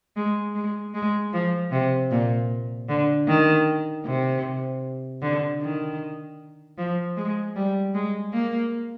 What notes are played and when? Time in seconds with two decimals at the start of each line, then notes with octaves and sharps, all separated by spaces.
0.16 G#3
0.55 G#3
0.94 G#3
1.33 F3
1.72 C3
2.11 A#2
2.89 D3
3.27 D#3
4.05 C3
5.22 D3
5.61 D#3
6.78 F3
7.17 G#3
7.56 G3
7.94 G#3
8.33 A#3